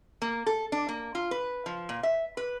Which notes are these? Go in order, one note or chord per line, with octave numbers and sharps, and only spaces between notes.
A#3
A4
D4
A#3
F4
B4
F3
A#2
E5
B4